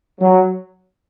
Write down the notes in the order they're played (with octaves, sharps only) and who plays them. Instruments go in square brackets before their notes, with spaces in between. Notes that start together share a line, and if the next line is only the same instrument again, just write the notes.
[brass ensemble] F#3